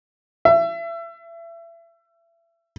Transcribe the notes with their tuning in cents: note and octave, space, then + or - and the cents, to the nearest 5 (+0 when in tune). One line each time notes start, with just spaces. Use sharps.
E5 +30